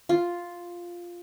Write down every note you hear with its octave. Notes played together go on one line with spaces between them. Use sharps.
F4